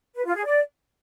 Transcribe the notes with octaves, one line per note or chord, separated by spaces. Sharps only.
B4
F4
G#4
D5